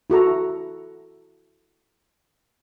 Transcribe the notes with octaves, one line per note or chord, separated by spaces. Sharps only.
E4 F#4 A4 A#5